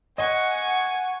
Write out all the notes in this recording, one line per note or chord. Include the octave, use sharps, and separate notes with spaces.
D#5 F#5 G#5 C#6